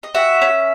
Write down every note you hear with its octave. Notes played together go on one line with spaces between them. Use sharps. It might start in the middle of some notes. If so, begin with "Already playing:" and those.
D#5
F#4 E5
C#4